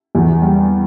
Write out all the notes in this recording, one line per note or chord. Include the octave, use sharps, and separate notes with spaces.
E2
G3